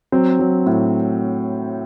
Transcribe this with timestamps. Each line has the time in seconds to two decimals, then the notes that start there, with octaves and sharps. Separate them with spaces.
0.12 F#3 C4
0.39 F#3
0.66 A2